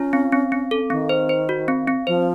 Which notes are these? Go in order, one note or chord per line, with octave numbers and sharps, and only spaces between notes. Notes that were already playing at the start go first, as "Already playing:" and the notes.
Already playing: C#4 F4
C4
C4
C4
A4
D#3 C4
C5
C5
F#4
C4
C4
F3 C5